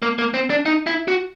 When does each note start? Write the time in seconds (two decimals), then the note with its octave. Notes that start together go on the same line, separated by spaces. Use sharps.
0.02 A#3
0.19 A#3
0.34 C4
0.50 D4
0.66 D#4
0.87 E4
1.08 F#4